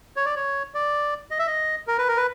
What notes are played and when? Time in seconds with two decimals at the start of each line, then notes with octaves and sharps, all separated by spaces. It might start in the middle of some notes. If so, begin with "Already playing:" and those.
0.16 C#5
0.26 D5
0.36 C#5
0.74 D5
1.31 D#5
1.39 E5
1.47 D#5
1.87 A#4
1.98 B4
2.08 A#4
2.17 B4